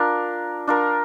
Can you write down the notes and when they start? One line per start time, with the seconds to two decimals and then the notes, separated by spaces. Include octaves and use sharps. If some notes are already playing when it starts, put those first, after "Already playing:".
Already playing: D4 F4 A#4
0.67 D4 F4 A#4